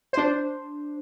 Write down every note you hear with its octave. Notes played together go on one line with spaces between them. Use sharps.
D4 C5